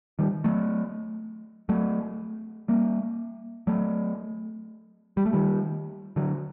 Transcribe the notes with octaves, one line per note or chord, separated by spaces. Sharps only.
D#3 G3
F#3 A3
F#3 A3
G3 A#3
F#3 A3
G3
A3
D#3 G3
D3 F#3